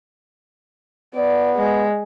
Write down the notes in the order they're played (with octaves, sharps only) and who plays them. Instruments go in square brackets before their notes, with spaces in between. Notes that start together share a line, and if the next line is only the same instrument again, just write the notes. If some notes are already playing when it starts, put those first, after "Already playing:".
[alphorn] B3 [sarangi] D5
[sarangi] G#3